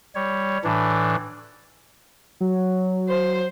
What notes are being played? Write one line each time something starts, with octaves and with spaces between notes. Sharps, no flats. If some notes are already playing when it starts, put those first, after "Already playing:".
G3 C#5
A2 E3 D4
F#3
C5